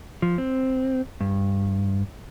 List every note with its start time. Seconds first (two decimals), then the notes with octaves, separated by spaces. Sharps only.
0.22 F3
0.38 C4
1.21 G2